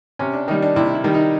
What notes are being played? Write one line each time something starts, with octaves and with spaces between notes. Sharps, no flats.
C3 C#4
D4
D#3 G3 D#4
D4
C3 E4
E4
D#3 G3
D#4